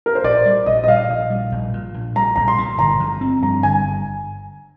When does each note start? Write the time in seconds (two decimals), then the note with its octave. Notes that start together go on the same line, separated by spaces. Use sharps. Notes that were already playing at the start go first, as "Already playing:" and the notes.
0.06 A#4
0.15 C5
0.24 A#1 D5
0.46 G3
0.66 A#1 D#5
0.84 D#5
0.88 A#2 F5
1.10 A#1
1.30 G3
1.52 A#1
1.74 A#2
1.94 A#1
2.15 G3 A#5
2.36 A#1 A#5
2.48 C6
2.58 A#2
2.79 G1 A#5
3.00 F3
3.21 C4
3.42 G2 A#5
3.63 G1 G#5